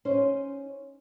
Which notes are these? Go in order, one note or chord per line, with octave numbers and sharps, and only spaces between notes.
C#4 D#4 C5